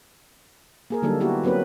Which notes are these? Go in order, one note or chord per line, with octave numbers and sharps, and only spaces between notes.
A#3 G#4 A#4
D3 F#3 G3 A#3 D#4 A4
A#3 B3 E4 F#4 G4
F#3 A#3 C4 C#4 B4